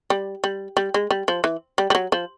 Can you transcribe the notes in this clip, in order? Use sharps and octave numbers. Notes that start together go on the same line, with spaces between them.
G3
G3
G3
G#3
G3
F3
E3
G3
G3
F#3
F3